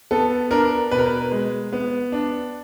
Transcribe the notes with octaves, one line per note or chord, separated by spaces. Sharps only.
B3 A4
D4 A#4
B2 B4
A#4
B4
G#3
B3
D4